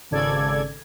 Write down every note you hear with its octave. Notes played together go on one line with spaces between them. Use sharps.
G#1 C#3 A4 D5 G#6